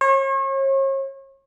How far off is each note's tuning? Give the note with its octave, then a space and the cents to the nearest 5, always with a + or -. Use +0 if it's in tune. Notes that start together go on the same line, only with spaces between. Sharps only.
C#5 -40